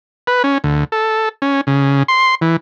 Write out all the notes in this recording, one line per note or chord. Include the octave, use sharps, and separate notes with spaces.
B4
C#4
D2
A4
C#4
C#3
C6
E3